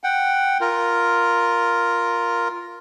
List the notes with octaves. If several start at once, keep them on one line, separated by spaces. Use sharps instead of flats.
F#5 G5
F4 A#4